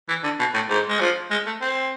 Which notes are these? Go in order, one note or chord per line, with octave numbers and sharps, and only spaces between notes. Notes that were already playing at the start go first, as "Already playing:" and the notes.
E3
D3
B2
A2
G#2
G#3
F3
G#3
A3
C4